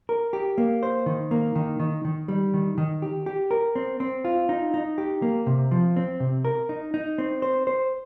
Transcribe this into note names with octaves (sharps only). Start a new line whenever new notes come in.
A#4
G4
A#3
C5
D#3
A#3
D#3
D#3
D#3
G3
D#3
D#3
G4
G4
A#4
C4
C4
F4
D#4
D#4
G4
A#3
C3
F3
C4
C3
A#4
D#4
D#4
C4
C5
C5